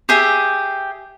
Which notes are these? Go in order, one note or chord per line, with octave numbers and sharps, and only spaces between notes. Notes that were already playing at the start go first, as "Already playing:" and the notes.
G4 G#4 E5